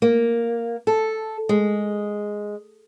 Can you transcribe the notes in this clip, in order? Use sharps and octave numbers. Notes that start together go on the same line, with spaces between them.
A#3
A4
G#3